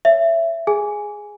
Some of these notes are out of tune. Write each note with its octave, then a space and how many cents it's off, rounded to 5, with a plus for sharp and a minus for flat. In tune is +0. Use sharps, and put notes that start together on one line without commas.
C#5 +0 E5 +15
G#4 +0 G#5 +0